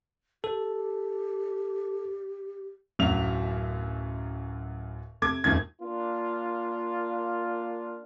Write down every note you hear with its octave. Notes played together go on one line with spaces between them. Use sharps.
G4 A4
D1 F#2 F#3 E5 F7
C3 A4 D6 G#6
D#1 F#2 D#3 G#6
A#3 D4 F4